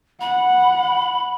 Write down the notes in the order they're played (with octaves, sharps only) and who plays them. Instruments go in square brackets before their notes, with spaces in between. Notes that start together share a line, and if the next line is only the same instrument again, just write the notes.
[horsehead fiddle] F#5 [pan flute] B5